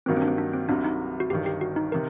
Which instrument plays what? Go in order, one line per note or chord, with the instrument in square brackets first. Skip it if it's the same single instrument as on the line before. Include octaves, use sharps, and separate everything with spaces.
[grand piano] G2 D#3 F#3 A#3 [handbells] C4
[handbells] C4
D4
C4
D4
C4
[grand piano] C2 C3 F#3 [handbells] D4
[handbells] D#4
F#4
[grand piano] G1 G2 D#3 [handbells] G4
[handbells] G4
F#4
D#4
[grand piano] C3 D#3 [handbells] A#4